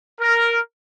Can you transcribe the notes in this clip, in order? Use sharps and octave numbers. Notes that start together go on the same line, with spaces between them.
A#4